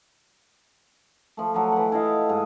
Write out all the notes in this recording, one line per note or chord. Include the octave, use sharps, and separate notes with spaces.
F3 A3
F3 F#3
E3 F#5
E4 A4 D#5 F5
G#2